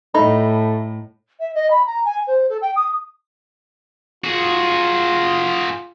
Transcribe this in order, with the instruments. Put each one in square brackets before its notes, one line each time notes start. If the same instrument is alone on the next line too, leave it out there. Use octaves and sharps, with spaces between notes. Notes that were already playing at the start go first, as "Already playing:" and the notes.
[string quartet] A2 [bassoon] A3 [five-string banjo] D#4 [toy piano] B5
[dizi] E5
D#5
B5
A#5
G#5
C5
A4
G5
D#6
[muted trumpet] F4 [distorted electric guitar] F#4 G#4